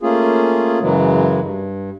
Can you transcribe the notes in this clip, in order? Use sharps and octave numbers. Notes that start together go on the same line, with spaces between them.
A3 A#3 C#4 F4 G#4
F#2 C#3 E3 F#3 G#3
G2